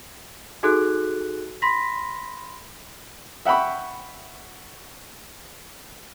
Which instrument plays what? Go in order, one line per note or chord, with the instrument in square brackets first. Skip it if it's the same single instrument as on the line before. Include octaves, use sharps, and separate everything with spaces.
[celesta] D#4 F#4 G#4 A4 F#6
B5 C6 A#6 B6
[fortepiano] E5 F#5 G5 B5 C#6